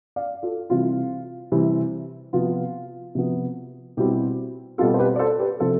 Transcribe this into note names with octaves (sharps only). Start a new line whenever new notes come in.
D5 F5
F4 A4
C3 E3 G3 C4 F4
C3 E3 G3 C4
C3 F3 B3 F4
C3 F3 B3
B2 G3 C4 E4 G4
B2 G3 C4 F4 A4
C5
G4 B4
D5
A4 C5
G4 B4
C3 F3 C4 A4 C5